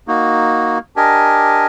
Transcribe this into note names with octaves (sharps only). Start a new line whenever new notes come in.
A#3 D#4 F#4
D4 G4 A#4 D#5 G#5